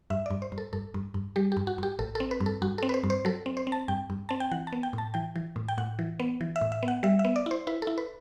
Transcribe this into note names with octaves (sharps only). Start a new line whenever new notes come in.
G2 E5
G2 D5
C5
G2
A4
G2 A4
G2
G2
G3 G4
G2 G4
F#4
G2 G4
A1 A4
C4 A4
B4
G2
A4
G2 F#4
C4 A4
B4
C5
G2
C5
F#3 A4
C4
C5
C4
A5
G2 G5
G2
C4 A5
G5
E3 F#5
A5
B3
G5
A2 A5
E3 G5
E3
A2
G5
A2 F#5
E3
B3
E3
E5
A2
E5
B3
F#5
G3 E5
E5
B3
D5
E4 C5
E4 B4
E4 A4
B4